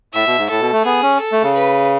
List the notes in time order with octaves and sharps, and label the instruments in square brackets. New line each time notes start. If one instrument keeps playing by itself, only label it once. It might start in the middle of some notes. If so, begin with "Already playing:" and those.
[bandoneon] A2 [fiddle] E5
[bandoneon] B2
G#2
[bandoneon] A2 [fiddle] A4
[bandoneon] B2
A3
[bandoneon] B3 [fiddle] G#4
[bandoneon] C#4
[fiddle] A4
[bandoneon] A3
C#3
[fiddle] B4